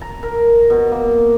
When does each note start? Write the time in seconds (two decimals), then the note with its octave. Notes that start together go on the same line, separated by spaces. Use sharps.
0.01 A#5
0.23 A#4
0.70 B2
0.91 A#3